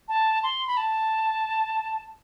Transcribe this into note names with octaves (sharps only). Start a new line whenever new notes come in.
A5
C6
B5
A5